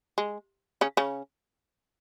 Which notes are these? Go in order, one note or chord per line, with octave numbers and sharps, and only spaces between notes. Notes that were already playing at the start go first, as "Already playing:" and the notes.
G#3
C#3 C#4
C#3 C#4